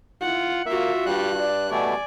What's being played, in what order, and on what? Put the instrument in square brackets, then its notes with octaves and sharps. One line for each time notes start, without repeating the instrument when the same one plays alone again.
[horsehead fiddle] E4 F#5 [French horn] F4
[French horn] A#3 [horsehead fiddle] F4 F#4 [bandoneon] E5
[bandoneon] G2 F#6 [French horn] G3
[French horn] D5
[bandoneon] B2 A3 [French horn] G3 [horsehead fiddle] D5 G#5